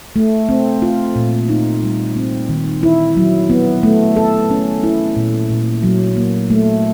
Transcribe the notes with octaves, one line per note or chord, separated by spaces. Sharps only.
A3
C4
F4
A#2
D#4
G3
C4
D#3
E4
F#3
B3
A3
A4
C#4
E4
A#2
A#2
F#3
A#3
A3